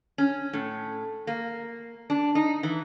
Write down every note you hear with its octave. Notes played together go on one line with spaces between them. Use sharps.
C#4
A2
A#3
D4
D#4
E3